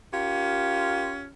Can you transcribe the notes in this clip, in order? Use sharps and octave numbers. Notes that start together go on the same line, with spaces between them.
C#4 F4 G4 A#4